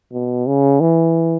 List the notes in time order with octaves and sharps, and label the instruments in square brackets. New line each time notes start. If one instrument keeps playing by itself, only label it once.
[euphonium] B2
C#3
E3